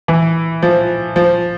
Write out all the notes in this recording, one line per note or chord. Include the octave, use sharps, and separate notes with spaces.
E3
F3
F3